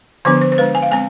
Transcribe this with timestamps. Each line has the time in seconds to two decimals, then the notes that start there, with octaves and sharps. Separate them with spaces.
0.25 D3 F3 B3 D4 C5
0.42 C5
0.52 C5
0.58 G#3 D4 B4
0.75 G#5
0.82 F5
0.91 G#3 C4 G#5